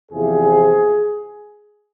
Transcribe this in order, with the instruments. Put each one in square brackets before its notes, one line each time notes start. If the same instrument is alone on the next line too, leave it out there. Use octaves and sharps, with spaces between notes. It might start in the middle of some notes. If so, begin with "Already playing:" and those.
[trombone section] E2 C3 F3 G#4